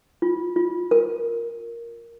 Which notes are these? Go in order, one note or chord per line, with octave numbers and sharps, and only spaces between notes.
F4
F4
A#4